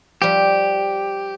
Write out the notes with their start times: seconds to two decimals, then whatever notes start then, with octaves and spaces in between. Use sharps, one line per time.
0.22 F3 G3 G4